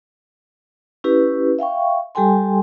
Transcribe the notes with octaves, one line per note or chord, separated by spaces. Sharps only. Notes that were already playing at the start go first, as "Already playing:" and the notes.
C#4 E4 G4 B4
E5 F5 G5 C#6
G3 G4 A4 G5 G#5 C6